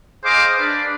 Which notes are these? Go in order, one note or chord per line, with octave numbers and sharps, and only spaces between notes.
G#4 C5 D#5 F5 D6
D4 B4 D5